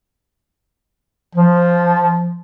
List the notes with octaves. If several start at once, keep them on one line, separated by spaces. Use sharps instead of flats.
F3